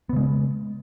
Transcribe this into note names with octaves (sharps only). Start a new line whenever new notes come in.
C#3 G#3 B3